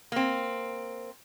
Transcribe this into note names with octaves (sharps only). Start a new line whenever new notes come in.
A#3 C4